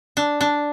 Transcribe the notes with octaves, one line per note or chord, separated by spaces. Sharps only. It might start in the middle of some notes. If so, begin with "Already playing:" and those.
D4
D4